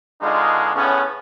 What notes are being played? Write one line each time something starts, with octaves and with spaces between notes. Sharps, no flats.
B2 D3 G#3 D4 D#4 F4
A2 C#3 B3 C#4